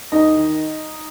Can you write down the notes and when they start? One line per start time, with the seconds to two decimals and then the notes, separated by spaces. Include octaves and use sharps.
0.12 D#2 D#4 D#5
0.36 D#3